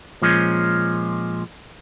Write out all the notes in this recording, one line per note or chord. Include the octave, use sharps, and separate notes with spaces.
A#2 F3 G#3 C#4